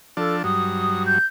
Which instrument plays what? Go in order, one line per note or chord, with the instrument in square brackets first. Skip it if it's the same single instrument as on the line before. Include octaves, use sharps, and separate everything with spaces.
[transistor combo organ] F3 D4 A5 [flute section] A4
[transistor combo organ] G2 F#3 [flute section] D#6
[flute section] G6